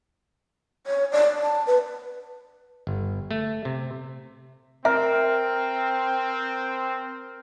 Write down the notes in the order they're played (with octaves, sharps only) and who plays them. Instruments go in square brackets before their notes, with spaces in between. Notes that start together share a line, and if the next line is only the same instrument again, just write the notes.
[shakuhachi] C#5
D5
A5
B4
[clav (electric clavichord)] G1
A3
C3
[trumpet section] C4 [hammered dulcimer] A#4 [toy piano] E5